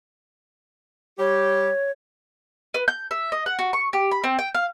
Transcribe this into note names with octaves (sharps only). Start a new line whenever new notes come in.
G3 G4 C#5
B4
G6
E5
D#5
F#5
F#4
C#6
G4
B5
C4
G5
F5